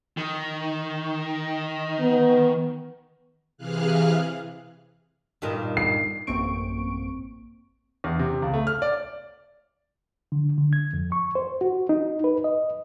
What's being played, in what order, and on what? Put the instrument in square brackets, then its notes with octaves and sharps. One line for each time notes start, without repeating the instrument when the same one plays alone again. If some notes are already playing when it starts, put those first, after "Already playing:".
[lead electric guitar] D#3
[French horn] B3
[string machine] C3 E3 G#4 F5 F6 F#6
[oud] G2 A#2 D#3
[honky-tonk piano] C7
[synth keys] A1 F#2 A#3 C4 C#6 D7
[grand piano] E2
C3
C#2
A3
F6
D5
[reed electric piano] D3
D3
G#6
F2
C#6
C5
F#4
D#4
B4
D#5